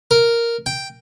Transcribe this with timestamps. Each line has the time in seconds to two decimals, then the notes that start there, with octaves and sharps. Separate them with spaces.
0.11 A#4
0.66 G5